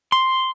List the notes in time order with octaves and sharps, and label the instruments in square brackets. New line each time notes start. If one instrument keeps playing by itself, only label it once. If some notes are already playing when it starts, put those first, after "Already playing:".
[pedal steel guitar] C6